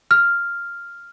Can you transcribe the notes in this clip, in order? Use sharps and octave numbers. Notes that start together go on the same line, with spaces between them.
F6